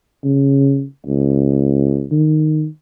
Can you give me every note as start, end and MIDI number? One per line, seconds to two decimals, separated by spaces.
0.24 0.85 49
1.06 2.06 37
2.12 2.66 51